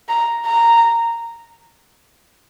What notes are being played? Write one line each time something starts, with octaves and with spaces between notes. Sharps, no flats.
A#5
A#5